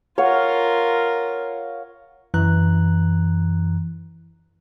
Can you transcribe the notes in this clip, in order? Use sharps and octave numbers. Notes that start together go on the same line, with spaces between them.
F4 A#4 C#5 F5 F#5
F#2 E3 A#5 F#6